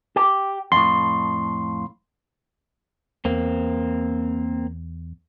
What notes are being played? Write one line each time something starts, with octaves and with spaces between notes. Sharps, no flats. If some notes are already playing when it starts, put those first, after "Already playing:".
G4
F2 A2 C6
E2 A#3 C4